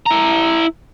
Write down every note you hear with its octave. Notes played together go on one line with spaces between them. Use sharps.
E4 A#5